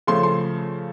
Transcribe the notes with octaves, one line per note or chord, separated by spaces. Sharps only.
C#3 F3 A3 C6
C6